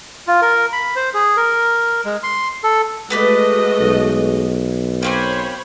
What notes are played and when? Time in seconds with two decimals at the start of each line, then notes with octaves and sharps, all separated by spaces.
0.27 F4
0.42 A#4
0.73 B5
0.96 C5
1.14 G#4
1.37 A#4
2.05 G#3
2.23 C6
2.64 A4
3.10 G#3 A3 B3 F#4 B4 D5 D#5
3.80 B1
5.03 A#3 C4 C5 C#5 G#5 B5